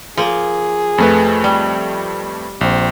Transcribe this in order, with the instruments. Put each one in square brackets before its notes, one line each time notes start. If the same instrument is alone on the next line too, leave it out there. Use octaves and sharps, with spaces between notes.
[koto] F3 A#3 [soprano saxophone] G#4
[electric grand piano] F2 A3 B4
[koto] G3
[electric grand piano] A#1 [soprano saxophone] C4